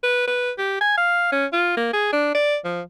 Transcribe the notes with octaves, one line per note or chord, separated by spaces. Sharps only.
B4
B4
G4
G#5
F5
C#4
F4
A#3
G#4
D4
D5
F3